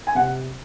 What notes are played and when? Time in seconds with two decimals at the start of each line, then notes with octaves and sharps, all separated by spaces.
0.07 G#5
0.15 C3 F#5